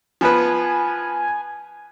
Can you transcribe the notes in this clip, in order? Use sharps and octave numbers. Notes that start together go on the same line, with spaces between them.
F3 B3 B4 G#5